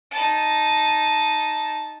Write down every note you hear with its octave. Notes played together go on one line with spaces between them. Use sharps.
D#4 A5